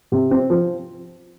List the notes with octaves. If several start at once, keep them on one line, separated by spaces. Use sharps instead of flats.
C3
C4
F3